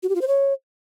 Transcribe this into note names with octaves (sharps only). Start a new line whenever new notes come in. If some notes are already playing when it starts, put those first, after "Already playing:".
F#4
G4
F4
C5
C#5